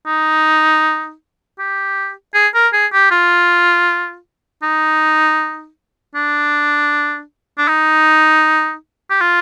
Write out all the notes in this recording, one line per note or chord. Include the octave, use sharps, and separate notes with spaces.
D#4
G4
G#4
A#4
G#4
G4
F4
D#4
D4
D4
D#4
G4
F4